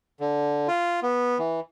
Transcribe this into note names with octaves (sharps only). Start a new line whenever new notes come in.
D3
F4
B3
E3